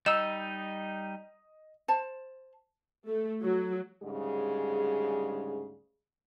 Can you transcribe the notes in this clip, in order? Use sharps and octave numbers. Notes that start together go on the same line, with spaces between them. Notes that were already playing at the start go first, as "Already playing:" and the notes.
G3 D#4 D#5 E6 E7
C5 A5
A3
F#3
D2 G#2 C#3 G3 G#4